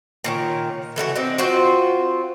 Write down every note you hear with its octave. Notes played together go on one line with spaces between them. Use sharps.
A#2 D#3 C#5
E3 A3 E4 F#4
C4 D4 D#4
C4 F4 F#4 C5